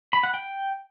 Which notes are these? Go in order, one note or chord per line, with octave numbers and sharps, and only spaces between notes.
B5
F#5
G5